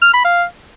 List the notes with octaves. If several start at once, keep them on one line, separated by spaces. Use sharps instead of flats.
F6
B5
F5